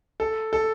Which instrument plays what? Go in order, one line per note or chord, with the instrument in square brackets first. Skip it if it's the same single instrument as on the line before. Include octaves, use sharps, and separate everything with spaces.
[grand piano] A4
A4